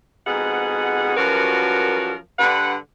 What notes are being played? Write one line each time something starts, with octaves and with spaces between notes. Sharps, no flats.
F2 G#2 B2 G#4 F#5
F#2 F3 G3 F#4 A#4 B4
G2 D3 B4 F#5